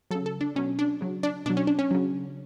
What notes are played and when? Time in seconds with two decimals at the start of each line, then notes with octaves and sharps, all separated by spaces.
0.11 F#3 A4
0.15 C#3
0.26 A4
0.41 D4
0.55 B2 F#3 C#4
0.79 D4
1.01 C#3 F#3
1.23 D4
1.46 B2 D4
1.50 F#3
1.57 C#4
1.67 D4
1.79 C#4
1.91 C#3 F#3